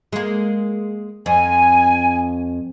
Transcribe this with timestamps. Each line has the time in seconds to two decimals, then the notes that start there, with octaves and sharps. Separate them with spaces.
0.13 G#3 A#3
1.26 F2 G#5